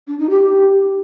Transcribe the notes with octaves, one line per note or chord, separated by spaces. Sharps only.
D4
D#4
G4